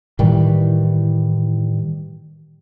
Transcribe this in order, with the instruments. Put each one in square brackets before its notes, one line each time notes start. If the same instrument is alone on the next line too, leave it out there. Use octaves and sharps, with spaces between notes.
[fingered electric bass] A2 D#3 E3 G3